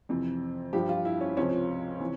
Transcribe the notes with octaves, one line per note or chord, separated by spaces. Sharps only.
F2 C3 E3
G2 F3 G4
F4
E4
C#4
C#2 C3 F3 C#4
C3 E3